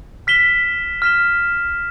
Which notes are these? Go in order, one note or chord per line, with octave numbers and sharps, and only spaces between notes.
F6 B6 E7 G7
F6 B6 E7 G7